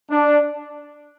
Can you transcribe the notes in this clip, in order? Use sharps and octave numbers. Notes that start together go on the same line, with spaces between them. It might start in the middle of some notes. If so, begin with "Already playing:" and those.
D4